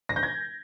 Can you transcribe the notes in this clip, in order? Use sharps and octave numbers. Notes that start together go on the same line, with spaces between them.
A#6
G6
G#6